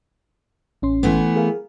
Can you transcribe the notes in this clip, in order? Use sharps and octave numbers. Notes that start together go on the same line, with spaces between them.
A1 C#4 C6
E3 A3 B3
G#4 A#4 F5